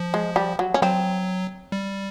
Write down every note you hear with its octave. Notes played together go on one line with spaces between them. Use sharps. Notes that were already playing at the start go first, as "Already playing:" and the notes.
Already playing: F3
G#3
G3
F#3
C#4
F#3 C4
G3